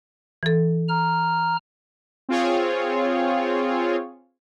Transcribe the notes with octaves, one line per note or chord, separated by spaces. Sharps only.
E3 A4
A#5 F6
C4 F4 G#4 C#5